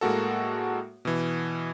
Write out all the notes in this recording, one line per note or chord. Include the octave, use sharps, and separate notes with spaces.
A2 G#3 A#3 F#4 A4
B2 E3